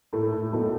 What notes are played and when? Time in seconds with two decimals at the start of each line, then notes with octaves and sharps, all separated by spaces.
0.13 A2 A3
0.32 A2
0.53 B1 A3